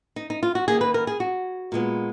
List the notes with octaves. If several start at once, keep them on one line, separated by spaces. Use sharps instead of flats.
D#4
D#4
F4
F#4
D#3 A#3 G#4
B4
A#4
G#4
F#4
A#2 G#3 B3